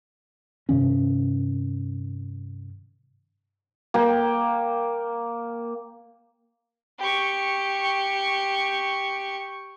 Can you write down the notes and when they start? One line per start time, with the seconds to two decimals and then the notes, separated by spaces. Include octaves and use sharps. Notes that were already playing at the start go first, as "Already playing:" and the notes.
0.69 G2 C3 D#3 C#4
3.94 A#3 G5
6.99 G4 C#6